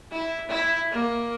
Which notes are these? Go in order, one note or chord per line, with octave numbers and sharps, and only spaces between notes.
E4
E4
A#3